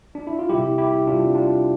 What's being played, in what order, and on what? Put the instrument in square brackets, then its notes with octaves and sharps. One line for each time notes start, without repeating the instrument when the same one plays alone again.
[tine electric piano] D4
E4
F4
C3 G3 E4 G4
E4 G4
C3 G3 D4 F4
D4 F4